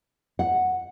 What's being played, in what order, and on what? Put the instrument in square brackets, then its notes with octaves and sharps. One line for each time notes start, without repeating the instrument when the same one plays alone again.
[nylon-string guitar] F#5